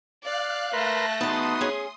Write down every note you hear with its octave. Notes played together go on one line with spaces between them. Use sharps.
D5 F5 F#6
A3 A#4 B4 A5 C6 F#6 A#6
E2 B3 D#4 F#4 A5 C6 D#6
C#4 G#4